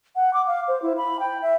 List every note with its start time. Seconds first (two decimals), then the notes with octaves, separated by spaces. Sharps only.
0.16 F#5
0.33 D6
0.47 F5
0.68 C5
0.82 E4
0.97 B5
1.20 G5
1.42 E5